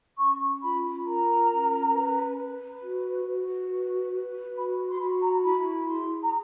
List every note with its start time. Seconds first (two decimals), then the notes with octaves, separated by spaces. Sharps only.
0.17 C#4 C#6
0.62 F4 B5
1.05 A#4 A#5
1.49 C#4
1.93 B4
2.36 B4
2.80 F#4
3.24 F#4
3.67 B4
4.11 B4
4.55 F#4 B5
4.89 C6
4.98 F#4 B5
5.21 A#5
5.43 E4 B5
5.86 G#4 C6
6.21 A#5